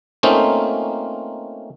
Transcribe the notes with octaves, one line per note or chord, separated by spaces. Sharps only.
A3 A#3 C4 C#4 D#4 F4